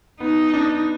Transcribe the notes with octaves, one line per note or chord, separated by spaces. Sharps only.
B3 D#4
D4